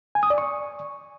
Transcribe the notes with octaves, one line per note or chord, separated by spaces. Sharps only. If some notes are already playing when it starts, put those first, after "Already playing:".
G#5
D#6
D5
C#6